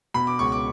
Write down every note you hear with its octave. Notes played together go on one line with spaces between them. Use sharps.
B2 B5
D6
C#2 C#6
D6